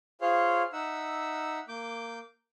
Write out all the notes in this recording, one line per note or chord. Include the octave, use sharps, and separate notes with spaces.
F4 G#4 C5 C#5 F5
D#4 E5 F#5 E6
A#3 D6 G6